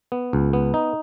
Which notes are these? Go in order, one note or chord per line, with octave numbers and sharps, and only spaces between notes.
B3
C#2
B3
D#4